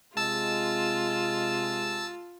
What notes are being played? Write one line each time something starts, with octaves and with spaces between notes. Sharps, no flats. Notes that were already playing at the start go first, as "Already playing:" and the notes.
C3 G#3 F4 A5 E6